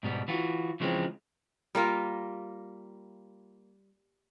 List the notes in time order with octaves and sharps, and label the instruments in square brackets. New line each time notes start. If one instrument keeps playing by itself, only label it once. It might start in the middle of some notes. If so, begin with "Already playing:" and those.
[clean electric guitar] G#2 B2 G3
E3 F4 F#4
C#3 E3 F3 G#3 C4
[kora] G3 A#3 F4